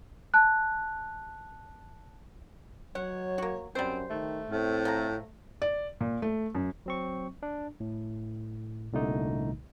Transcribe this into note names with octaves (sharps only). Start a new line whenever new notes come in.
A5 F#6
F#3 C#5 F#5
A#3 F#4
F#2 G3 C4 C5
D#3 A3
A2 C4
F3 A#5
D5
A#2
A3
F#2
F#3 C4 C#6
D4
A2
C2 A#2 D3 A3 D#4